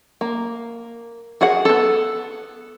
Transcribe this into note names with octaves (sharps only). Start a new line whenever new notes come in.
A#3
F#4 G#4 A#4 F#5
B3 A4